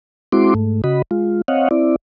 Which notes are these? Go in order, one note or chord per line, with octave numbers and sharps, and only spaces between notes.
G#3 C4 E4 F#4 C6 D6
G#2 A3
C#3 F#4 D#5 B5
G#3 F4
C4 C#5 D#5 F5 F#5
C4 E4 D5